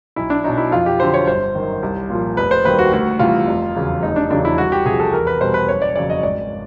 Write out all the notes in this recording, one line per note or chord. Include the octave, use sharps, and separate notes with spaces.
B1 E4
D4
B2 F#3 D#4
E4
F2 F4
G4
D3 F#3 C5
C#5
G1 C5
F#2 D#3
C2
A#2 F3
F1 B4
C5
D#2 D#3 G3 B4
F#4
D2 F#4
C3 E3 G3 F4
F1
E2 C#3 F#3
F1 D#4
D4
E2 C#3 F#3 D4
E4
C2 F#4
G4
C3 F3 G#4
A4
E2 A#4
B4
B2 G3 C5
B4
F#1 C#5
D5
F2 C#3 F#3 D5
D#5
G#1 D5